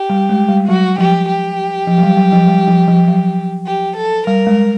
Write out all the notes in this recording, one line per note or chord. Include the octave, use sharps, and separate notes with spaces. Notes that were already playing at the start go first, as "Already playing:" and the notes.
Already playing: G4
G3
G#3
G3
F#3 F#4
F3 G4
G4
F3
F#3
G3
F#3
F3
G3
F3
F3
F#3
G4
A4
G3 A#4
G#3